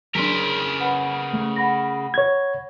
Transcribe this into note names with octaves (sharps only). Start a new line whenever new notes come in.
C#3 F#3 D4 A#4 C6 B6
B4 F#5 B5
A3
F#5 B5 A#6
C#5 G#6